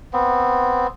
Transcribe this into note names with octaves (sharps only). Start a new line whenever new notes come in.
B3 C4